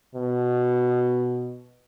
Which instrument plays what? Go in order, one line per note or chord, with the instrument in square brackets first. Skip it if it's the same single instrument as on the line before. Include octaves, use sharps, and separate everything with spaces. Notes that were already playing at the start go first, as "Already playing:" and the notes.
[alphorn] B2